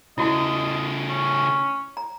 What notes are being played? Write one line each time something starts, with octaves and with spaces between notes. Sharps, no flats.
C#3 A3 E4 F#4 D#5 A5
C#4
A#5